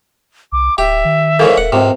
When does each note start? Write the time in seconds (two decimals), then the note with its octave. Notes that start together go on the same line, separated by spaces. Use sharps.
0.52 C2 D6
0.78 D1 G4 E5
1.05 D#3
1.39 G#2 C#3 E3 A4 A#4 F5
1.58 D#1 F#5
1.72 C#2 G#2 C3